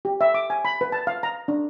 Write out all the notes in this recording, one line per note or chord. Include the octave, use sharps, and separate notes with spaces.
G4
E5
D6
G#5
B5
B4
A5
F5
A#5
D4